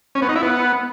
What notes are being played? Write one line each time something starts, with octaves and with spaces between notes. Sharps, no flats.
C#4
B3
D#4
E4
B3